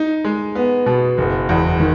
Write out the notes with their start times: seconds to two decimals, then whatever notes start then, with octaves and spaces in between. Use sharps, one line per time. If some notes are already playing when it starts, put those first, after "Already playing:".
Already playing: D#4
0.25 G#3
0.55 B3
0.86 B2
1.18 F#1
1.49 E2
1.80 D#3